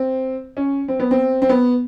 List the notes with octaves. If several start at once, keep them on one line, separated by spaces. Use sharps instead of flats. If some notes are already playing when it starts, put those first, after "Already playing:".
Already playing: C4
C#4
C4
B3
C4
C4
B3